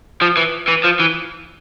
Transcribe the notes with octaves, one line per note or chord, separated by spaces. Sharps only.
F3
E3
E3
F3
E3